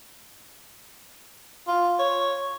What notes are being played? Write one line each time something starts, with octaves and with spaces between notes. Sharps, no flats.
F4
C#5